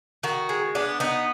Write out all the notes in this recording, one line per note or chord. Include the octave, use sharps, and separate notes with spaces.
D#3 F#4
G#3
B3 D4
B3 D#4